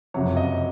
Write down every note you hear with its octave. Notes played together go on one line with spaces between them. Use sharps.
F#1 F2 C3 F#3 C#5
D#5